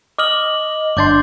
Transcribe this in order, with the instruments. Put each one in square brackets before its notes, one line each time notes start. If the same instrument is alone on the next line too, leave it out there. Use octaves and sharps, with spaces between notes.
[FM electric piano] D#5 [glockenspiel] D6 F6 F#7
[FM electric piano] G1 D4 C6 [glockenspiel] D6 G6 A6